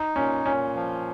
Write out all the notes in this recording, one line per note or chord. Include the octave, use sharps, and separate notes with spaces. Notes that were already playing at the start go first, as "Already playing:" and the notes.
Already playing: D#4
A#2 C#4
A#2 C#4
F3